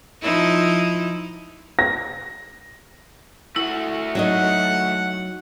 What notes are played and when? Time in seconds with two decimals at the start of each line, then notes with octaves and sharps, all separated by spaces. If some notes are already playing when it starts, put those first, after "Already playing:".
0.21 F3 D#4 E4
1.79 A#6
3.56 A3 E4 F#4
4.15 F#3 D#4 D#5 F#5